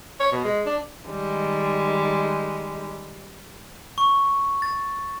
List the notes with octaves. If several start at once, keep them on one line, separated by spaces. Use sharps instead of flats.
C#5
B2
G#3
D4
D#3 G3 G#3
C#6
A6